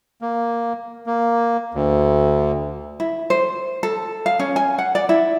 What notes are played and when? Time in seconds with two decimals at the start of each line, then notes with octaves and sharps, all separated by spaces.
0.22 A#3
1.07 A#3
1.74 D2
3.00 E4
3.30 C5
3.83 A4
4.26 F5
4.39 C#4
4.56 G#5
4.78 F#5
4.95 D5
5.09 E4